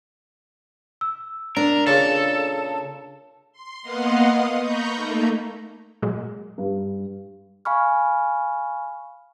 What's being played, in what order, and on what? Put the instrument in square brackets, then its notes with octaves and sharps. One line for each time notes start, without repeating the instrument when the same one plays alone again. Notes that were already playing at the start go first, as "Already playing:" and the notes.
[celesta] E6
[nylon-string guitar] D4 [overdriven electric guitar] A#4
[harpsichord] A#2 C#3 [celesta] G#4 A6 [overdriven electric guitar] A4
[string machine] C6
A#3 B3 D#5 F5 F#5 C6
D#6
A#5 B5 C#6 G6
A3 A#3 D#4
[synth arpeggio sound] A#2 F#3 G#3
[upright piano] G2
[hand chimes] F5 G#5 B5 C#6 F6